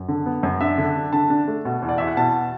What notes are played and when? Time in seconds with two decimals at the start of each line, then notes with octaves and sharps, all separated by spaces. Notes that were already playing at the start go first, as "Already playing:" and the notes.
Already playing: F#2
0.08 D3
0.26 B3
0.43 F#2
0.61 D4 E5
0.78 D3
0.96 D4
1.13 D3 A5
1.30 D4
1.48 A3
1.65 B2
1.82 E2
1.89 D5
1.98 E2 E5
2.08 F#5
2.17 B2 A5